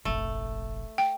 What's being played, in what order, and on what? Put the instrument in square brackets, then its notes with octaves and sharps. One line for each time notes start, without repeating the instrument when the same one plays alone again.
[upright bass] F1 A#1 [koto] A3
[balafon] G5